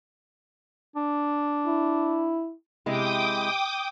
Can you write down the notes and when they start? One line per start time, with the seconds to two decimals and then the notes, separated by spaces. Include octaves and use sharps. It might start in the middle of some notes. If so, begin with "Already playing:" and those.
0.96 D4
1.67 E4
2.86 C3 G#3 E4 G5 D6 D#6